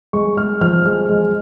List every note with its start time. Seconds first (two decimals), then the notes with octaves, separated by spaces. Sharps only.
0.13 G#3 C#6
0.37 G#3 F6
0.61 F3 F6
0.86 G#3 F6
1.09 G#3